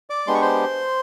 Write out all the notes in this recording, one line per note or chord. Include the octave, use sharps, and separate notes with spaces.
D5 D6
G#3 B3 D4 G4 C6
C#6
C5 C6